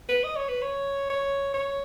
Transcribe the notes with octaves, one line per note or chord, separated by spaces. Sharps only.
B4
D#5
C#5
B4
C#5
C#5
C#5